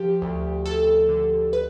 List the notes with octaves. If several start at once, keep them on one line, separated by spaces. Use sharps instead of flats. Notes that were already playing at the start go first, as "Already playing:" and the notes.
Already playing: F3 G4
D2
D2 A4
D3
B4